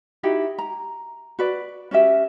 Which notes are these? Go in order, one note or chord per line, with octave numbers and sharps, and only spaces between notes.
D#4 E4 F#4 G4
A#5
F#4 B4 D5
C#4 F#4 G4 E5